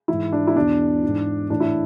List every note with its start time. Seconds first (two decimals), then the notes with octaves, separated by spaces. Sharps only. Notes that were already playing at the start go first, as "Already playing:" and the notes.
0.08 G#2 E3 E4
0.32 D4
0.47 E4
0.55 E2 B2 D4
1.03 G#2 E3
1.50 A2 E3 D4
1.60 E4